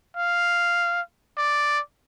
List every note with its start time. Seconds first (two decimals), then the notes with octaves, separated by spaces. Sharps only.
0.17 F5
1.37 D5